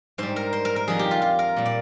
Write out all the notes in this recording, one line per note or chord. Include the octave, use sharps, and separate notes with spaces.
G#2 G3 C5
A#4
C5
A#4
A#4
F2 D#3 G3 G#4
G4
F4
F4
A#4
A#2 G3
D5